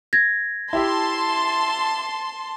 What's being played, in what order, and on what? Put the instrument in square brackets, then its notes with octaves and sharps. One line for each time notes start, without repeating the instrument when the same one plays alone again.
[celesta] G#6 A#6
[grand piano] E4 G4 E5 [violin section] A5 C6